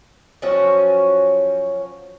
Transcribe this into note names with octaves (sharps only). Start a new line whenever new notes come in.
F3 F#3 C#4 F#4